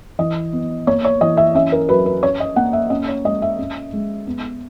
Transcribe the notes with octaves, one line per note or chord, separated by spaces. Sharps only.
E3 D#5
B3
A#3 C#5
C#5
E3 D#5
E5
C#4 E5
A#4
F#3 B4
B4
C#4 C#5
D#5
A#3 F#5
E5
C#4 D#5
C#5
G#3 D#5
E5
C#4
G#3
B3